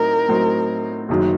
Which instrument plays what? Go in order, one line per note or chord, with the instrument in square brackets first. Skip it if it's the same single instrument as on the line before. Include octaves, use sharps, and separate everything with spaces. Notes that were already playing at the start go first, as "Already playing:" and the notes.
Already playing: [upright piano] A2 F#3 C4 D#4 [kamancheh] A#4
[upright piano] A2 F#3 C4 D#4
F#1 F#2 D#3 F#3